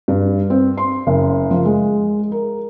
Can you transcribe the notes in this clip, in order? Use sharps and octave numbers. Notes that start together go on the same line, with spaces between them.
G2
C4
C6
F#1
F3
G#3
A#4